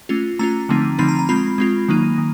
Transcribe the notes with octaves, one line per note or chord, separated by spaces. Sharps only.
A3 C#4 F4
A3 C#4 F4 A#5
D3 F3 A3 C4 D#4
D3 F3 A3 C4 D#4 B5
A#5
A#5
G#3 C4 F4 B5
G#3 C4 F4
D#3 F#3 A#3 D#4
D#3